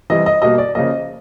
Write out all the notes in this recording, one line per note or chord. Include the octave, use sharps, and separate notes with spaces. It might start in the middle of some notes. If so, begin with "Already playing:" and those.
C3 E3 G3 D#5
D#5
B2 G3 A#3 D#5
D5
C#3 F3 A#3 D#5